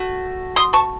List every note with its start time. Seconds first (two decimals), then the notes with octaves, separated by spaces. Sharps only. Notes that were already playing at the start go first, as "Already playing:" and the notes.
Already playing: A3 F#4
0.56 C6 D#6
0.73 A5 C#6